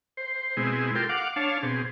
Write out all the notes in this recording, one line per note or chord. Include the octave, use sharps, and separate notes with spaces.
C5
B2 G#3 C4 E4 G#4
F4 G4 A4 A#4 G5 C6
F5 F#5 D6
D4 C#5 F5 A5
B2 C4 G#4